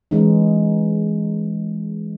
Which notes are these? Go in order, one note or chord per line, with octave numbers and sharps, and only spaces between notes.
E3 G#3 C#4 D#4